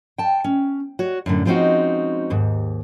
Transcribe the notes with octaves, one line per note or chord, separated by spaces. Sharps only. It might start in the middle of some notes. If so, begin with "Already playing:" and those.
G5 A5
C#4
F#4 C#5
F#2 A2 D3
F3 G#3 C4 C#4 D#4 F#4
D#2 G#2